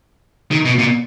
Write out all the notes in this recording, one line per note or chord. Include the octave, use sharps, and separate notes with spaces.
D#3
B2
A#2